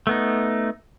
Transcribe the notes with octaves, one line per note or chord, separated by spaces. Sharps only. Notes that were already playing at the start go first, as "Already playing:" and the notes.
A3 B3 D#4